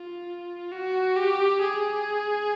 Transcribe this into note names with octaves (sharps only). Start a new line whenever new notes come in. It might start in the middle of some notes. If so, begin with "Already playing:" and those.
Already playing: F4
F#4
G4
G#4